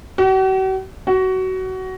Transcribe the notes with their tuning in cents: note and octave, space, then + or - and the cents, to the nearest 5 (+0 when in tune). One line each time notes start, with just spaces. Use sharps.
F#4 +45
F#4 +20